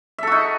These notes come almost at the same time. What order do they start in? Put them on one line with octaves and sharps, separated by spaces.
E5 A4 F#4 D#4